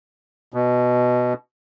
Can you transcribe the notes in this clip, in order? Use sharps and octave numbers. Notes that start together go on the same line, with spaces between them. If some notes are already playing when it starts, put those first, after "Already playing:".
B2